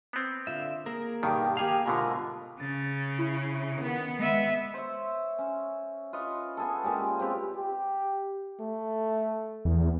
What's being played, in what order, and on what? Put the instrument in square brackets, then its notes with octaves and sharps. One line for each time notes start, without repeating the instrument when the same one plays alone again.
[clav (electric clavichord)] B3 C4
[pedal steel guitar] D3 F4 E5
A#3 G#4 A#4
[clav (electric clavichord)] G2 B2 D#3 [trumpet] G4
[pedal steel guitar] A#3 G#4 F5 [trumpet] G4
[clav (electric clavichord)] G#2 B2 D3 [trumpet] F4 [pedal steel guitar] A#4
[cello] C#3 [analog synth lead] A6
[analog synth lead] E4
[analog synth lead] D#3 [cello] B3
[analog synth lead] G#3 [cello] B3 E5
[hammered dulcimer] C5 C#5 E5
C#4
F4 B4 D#5 C#6
B3 G#4 A4
A#2 G#3 C#4 G4
C4 F4 G4 B4
[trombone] G4
A3
[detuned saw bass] E2